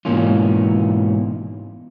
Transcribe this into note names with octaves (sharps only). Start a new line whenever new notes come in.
G#2 B2 E3 A#3 C#4 F4